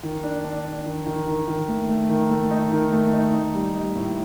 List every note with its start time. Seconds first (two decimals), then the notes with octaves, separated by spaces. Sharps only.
0.03 D#3
0.24 D4
0.45 D4
0.65 D4
0.86 D#3
1.07 D#3
1.28 D#3
1.48 D#3
1.68 A3
1.89 A3
2.09 D#3
2.30 A3
2.51 D#4
2.72 D#3
2.92 A3
3.13 D#4
3.34 D#4
3.55 G3
3.75 D#4
3.96 A2